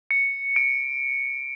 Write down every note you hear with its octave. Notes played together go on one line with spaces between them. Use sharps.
C#7
D7